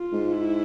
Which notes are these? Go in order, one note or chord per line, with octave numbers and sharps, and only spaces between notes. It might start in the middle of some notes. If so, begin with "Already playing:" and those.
Already playing: F4
G#2
E4